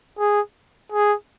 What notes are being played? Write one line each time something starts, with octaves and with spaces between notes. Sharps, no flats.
G#4
G#4